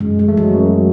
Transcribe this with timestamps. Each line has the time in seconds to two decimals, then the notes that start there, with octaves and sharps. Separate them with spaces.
0.01 F#2 G#3
0.19 G#3
0.28 E3 A3
0.37 F#3
0.55 F#2